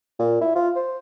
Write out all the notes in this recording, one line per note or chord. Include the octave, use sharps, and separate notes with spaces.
A#2
E4
F4
C5